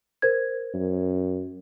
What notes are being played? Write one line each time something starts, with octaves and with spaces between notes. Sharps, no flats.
A#4 C5 G#6
F#2